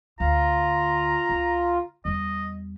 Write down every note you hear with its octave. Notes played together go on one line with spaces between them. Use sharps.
D2 F4 A#5
C#2 C#3
E2 G3 D#5